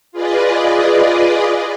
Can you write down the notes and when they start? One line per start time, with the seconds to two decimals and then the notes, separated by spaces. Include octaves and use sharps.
0.12 F4 G#4 B4 D5 D#5